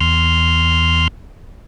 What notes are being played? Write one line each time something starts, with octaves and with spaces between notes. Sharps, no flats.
E2 C6 F6